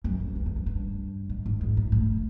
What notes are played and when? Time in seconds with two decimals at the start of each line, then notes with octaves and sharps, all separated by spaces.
0.04 F#2
0.20 F2
0.36 E2
0.46 F2
0.56 F#2
0.66 G2
1.30 G#2
1.46 G#2
1.61 F2
1.77 G#2
1.92 A2